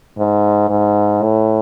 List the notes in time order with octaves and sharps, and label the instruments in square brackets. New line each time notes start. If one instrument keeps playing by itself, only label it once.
[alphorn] G#2
G#2
A2